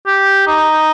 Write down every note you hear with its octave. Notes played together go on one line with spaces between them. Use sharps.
G4
D#4